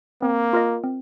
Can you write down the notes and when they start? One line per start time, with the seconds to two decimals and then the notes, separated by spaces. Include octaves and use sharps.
0.22 A#3 C4
0.53 F4 A#4 D#5
0.84 C4